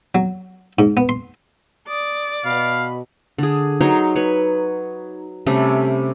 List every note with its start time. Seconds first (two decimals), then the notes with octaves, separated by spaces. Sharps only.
0.15 F#3
0.79 G#2
0.97 B3
1.09 C6
1.88 D5 D#6
2.45 B2 F5 B5
3.38 D3 G#4
3.81 F#3 D#4 C#5 C6
4.16 B4 C#5
5.46 C3 G3 A3 C#4